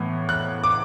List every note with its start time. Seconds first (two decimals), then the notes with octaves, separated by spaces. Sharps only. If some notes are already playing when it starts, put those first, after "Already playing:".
Already playing: A2 E3 B3
0.29 F#6
0.64 D6